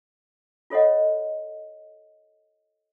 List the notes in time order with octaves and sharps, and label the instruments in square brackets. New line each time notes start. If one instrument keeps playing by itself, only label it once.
[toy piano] F4 A4 C#5 D#5 F#5